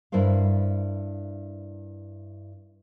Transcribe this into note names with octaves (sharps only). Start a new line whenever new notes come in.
G2 E4 A#4 C5 F5